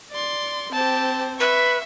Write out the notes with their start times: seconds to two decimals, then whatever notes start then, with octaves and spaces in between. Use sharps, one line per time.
0.11 D5 C6
0.72 C4 G4 C5 A5
1.40 B4 E5 C#6